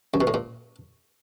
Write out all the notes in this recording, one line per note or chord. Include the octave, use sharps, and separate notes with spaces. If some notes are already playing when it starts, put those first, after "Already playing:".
F#2
B2
A2
A#2